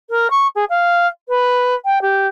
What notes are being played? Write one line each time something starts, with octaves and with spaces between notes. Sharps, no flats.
A#4
C#6
G#4
F5
B4
G5
G4